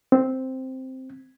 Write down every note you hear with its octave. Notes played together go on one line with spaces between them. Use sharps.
C4